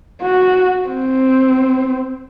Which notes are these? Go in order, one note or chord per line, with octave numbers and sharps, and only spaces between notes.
F#4
C4